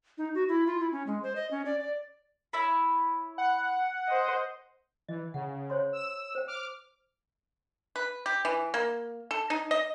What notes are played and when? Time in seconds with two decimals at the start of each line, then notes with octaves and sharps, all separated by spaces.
0.18 D#4
0.35 F#4
0.49 E4
0.67 F4
0.80 E4
0.92 C#4
1.07 G#3
1.23 C5
1.36 D#5
1.51 C#4
1.66 D5
1.80 D5
2.53 E4 C#5 B5
3.38 F#5
4.08 C5 D#5
5.09 E3 D#5
5.34 C#3 F#5
5.70 C5 C#5 C6
5.93 E6 E7
6.35 C5 G5
6.48 D6 F6
7.96 B4
8.26 G4
8.45 E3
8.74 A#3
9.31 A4
9.50 D#4
9.71 D#5